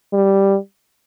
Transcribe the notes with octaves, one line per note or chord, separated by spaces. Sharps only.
G3